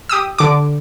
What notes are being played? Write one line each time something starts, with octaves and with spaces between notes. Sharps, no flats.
G4 D#6 E6
D3 D6